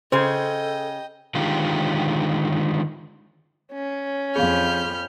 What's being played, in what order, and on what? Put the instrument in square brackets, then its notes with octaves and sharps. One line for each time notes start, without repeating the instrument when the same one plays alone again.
[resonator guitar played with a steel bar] C#3 G#4 [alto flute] A4 [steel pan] C5 [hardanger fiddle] D#5 G5
[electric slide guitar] D3 D#3 G#3 F4 G4
[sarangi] C#4
[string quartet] F2 B5 [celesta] G#4 F5 [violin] F6 G6